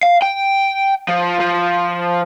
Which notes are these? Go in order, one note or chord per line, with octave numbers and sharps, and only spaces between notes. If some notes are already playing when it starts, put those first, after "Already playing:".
F5
G5
F3
F3